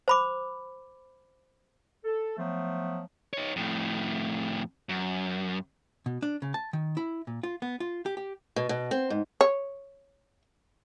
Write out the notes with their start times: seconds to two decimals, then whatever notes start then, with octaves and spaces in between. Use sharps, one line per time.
0.08 C5 B5 D6
2.04 A4
2.38 F3 F#3 A3 B3
3.34 D#4 C#5
3.56 F2 A2
4.89 F#2
6.06 B2
6.22 D4
6.42 C#3
6.54 A5
6.73 D#3
6.97 E4
7.27 A#2
7.43 F4
7.62 B3
7.80 F4
8.06 G4
8.17 G4
8.56 B2
8.69 B2
8.91 C4
9.10 G#2
9.41 C#5